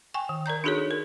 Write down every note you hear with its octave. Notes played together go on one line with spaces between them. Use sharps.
G5 G#5 C#6
D#3
A#4 D5 A#5 G6
D4 D#4 F#4 G#4 A4 C#5
A#4